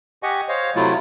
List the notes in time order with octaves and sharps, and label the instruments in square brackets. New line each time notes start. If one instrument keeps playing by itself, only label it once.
[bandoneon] G4 D#5 F#5 G#5 C#6
C5 C#5 D#5 F5
C3 F#3 A3 E4 F4